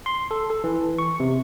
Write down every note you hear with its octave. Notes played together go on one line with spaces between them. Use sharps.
C6
A4
A4
E3
C#6
C3